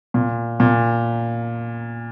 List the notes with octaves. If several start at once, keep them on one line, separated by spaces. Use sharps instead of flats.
A#2
A#2